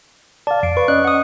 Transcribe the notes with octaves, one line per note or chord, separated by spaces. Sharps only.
D5 F5 A5
F2 C7 D7
B4 C#6
C#4 D5 D#5 F#6
F#5 D#6